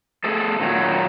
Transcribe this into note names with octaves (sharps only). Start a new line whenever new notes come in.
A3 G#4 A4
A#2 D#3 F#3